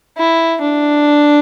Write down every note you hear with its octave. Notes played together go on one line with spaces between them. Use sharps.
E4
D4